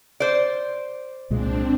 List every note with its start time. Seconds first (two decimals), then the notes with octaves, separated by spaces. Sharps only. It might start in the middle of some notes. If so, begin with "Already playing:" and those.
0.20 C5 D5
1.30 C2 A#2 G#3 C4 D4